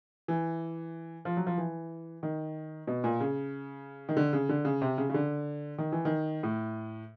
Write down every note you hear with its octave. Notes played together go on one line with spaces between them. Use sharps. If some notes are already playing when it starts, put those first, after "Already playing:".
E3
F3
F#3
F3
E3
D#3
B2
A#2
C#3
D#3
D3
C#3
D3
C#3
C3
C#3
C#3
D3
D#3
E3
D#3
A2